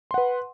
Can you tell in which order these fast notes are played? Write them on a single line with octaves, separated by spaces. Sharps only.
C6 F#5 B4